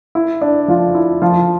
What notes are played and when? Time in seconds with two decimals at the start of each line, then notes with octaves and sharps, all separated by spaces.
0.15 E4
0.41 D4
0.68 F3 F4
0.95 E4
1.22 F3 F4